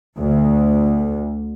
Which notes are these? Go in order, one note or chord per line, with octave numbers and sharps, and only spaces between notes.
D2